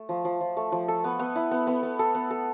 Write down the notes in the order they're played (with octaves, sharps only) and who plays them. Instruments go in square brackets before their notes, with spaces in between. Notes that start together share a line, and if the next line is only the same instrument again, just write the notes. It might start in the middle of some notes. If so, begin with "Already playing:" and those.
Already playing: [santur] A3
F3
F3
F3
A3
F3
A4
B3
B3
E4
B3
B3
B3
A4
B3
A4